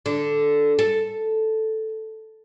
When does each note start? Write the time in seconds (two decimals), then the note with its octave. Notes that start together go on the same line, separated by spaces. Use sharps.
0.06 D3
0.79 A4